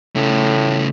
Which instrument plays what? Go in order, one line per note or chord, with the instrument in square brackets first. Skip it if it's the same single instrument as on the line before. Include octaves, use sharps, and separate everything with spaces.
[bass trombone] A2 [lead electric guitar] C#3 A3